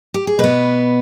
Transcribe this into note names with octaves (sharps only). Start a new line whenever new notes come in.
G4
G#4
B2 B3 B4